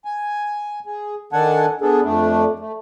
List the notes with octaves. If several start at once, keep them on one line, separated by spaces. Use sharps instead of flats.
G#5
G#4
D#3 D4 A4 F#5 G#5 A5
B3 D4 G#4 A4
F2 A3 D4
A3